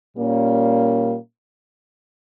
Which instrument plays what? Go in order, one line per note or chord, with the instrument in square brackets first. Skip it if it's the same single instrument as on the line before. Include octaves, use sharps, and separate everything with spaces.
[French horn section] A#2 G3 A#3 C#4